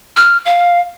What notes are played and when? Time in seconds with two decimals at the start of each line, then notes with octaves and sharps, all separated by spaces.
0.16 F6
0.45 F5